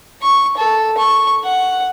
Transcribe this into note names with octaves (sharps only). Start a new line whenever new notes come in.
C#6
A4
C#6
F#5